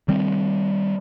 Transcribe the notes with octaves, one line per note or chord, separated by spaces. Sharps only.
D#3 G3 C4